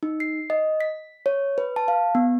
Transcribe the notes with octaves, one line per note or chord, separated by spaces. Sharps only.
D#4
C7
D#5
B6
C#5
B4
A5
F5
B3